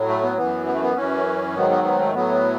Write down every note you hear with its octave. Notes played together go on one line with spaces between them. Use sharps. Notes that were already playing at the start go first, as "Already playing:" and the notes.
Already playing: A2 F#3
A3
B3
F#2 E3 B3
B3
A3
B3
F#2 E3 C#4
G#2 D#3 F#3 B3
B3
B3
A3
A2 F#3 B3